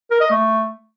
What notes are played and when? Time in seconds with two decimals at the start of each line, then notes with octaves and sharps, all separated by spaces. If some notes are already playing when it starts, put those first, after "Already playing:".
0.11 A#4
0.21 D#5
0.31 A3